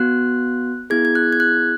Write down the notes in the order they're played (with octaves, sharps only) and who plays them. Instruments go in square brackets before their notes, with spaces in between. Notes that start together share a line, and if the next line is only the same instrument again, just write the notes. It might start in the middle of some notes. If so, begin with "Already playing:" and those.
Already playing: [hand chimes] B3 F#4 F#6
B3 E4 G#4 G#6
G#6
F#6
G#6
F#6